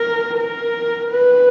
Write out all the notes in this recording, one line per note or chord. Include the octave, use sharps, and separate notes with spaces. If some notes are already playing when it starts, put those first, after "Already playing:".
Already playing: A#4
A#4
B4